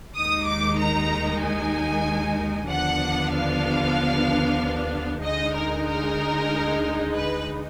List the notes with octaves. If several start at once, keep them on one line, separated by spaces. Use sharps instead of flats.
D#2 D#3 G#3 D#4 D#6
D6
A#5
G#5
D#2 D3 F3 B3 D4 F#5
F5
D2 D3 G#3 D#4 D#5
A#4
A#4
B4